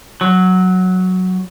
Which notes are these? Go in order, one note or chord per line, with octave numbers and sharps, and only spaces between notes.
F#3